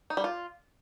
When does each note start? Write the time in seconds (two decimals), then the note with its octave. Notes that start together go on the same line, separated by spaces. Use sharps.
0.10 D#4
0.17 G3
0.24 F4